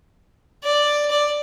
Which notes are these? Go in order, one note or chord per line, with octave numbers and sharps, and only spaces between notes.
D5
D5